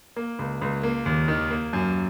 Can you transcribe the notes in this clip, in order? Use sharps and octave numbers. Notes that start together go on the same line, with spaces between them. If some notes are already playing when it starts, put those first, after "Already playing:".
A#3
C#2
C#2
A#3
D#2
D#3
A#3
F#2